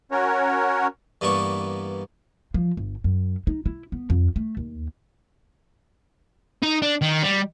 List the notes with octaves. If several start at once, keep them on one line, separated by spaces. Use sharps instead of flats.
C#4 F#4 A#4 C#5
G2 E3 A#3 B3 D5 C#6
F3
G1
F#2
D#4
E4
B3
F2
A3
D#2
D#4
D4
D#3
G3